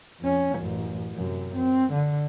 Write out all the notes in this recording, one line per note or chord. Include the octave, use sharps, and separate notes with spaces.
F2 C#4
A1 F#2
F#2 C3
C4
D3